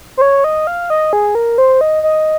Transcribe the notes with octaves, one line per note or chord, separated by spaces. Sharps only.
C5
C#5
D#5
F5
D#5
G#4
A#4
C5
D#5
D#5